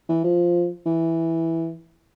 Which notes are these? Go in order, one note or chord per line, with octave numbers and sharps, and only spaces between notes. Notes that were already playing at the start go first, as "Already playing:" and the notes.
E3
F3
E3